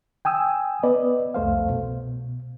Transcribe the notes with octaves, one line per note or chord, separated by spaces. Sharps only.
G5 G#5 D#6 E6
B3 B4 D5 D#5
C2 F2 A3 C5 F5
B2